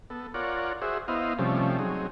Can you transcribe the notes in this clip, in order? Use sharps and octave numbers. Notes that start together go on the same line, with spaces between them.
B3 A4
F4 A#4 C#5 D5 F#5
F#4 G#4 C5 E5
B3 E4 C5 D#5 F5
C3 F3 G3 A3 C#4
F#3 C4 D#4 G#4